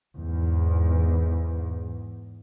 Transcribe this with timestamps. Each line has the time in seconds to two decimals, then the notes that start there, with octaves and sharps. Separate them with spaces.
0.16 E2 G#2